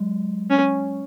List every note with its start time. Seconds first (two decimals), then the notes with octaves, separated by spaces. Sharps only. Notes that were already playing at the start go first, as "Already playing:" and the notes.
Already playing: F#3 G#3
0.50 C#4